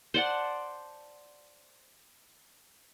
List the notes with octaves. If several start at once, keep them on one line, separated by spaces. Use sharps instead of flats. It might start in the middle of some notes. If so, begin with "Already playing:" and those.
C5 D5 F#5 A5